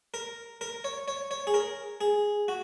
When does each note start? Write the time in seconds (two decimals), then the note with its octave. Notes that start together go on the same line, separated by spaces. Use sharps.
0.14 A#4
0.61 A#4
0.84 C#5
1.08 C#5
1.31 C#5
1.47 G#4
1.54 A#4
2.01 G#4
2.48 F#4